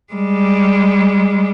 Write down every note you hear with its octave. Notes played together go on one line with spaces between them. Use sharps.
G3 G#3